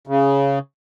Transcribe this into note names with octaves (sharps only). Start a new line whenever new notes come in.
C#3